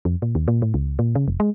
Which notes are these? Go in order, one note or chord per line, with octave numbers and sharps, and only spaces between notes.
F2
A#2
D#2
A#2
A2
C#2
A#2
C#3
F1
G#3